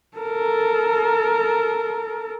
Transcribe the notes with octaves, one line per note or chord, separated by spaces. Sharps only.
A4 A#4